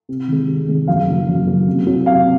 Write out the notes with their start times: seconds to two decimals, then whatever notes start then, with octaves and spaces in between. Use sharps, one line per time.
0.09 C3
0.28 D#3 G#3
0.48 C3
0.68 D#3 G#3
0.87 F#2 F5
1.07 C#3 F#3 A#3
1.27 F#2
1.47 C#3 F#3 A#3
1.67 C3
1.87 F#3 C#4
2.06 C3 F5